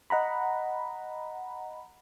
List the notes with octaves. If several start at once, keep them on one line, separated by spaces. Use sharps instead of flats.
D#5 F#5 A#5 B5